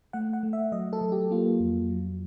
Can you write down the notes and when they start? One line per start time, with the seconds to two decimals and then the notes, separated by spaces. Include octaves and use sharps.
0.13 A3 F#5
0.33 F#5
0.43 A3
0.53 E5
0.72 F#3 D#5
0.93 A4
1.01 F#3
1.12 G4
1.31 A#3 F4
1.60 F2
1.89 F#3